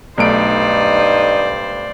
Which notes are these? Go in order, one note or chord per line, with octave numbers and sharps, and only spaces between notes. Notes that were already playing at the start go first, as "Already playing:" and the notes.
B1 G2 A3 D#4 C5 D5 D7